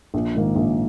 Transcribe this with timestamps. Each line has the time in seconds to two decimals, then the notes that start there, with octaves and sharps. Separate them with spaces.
0.14 A#1
0.35 G#2 D#3 A#3
0.56 A#1